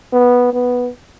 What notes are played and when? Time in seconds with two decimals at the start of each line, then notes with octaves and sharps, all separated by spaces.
0.13 B3
0.53 B3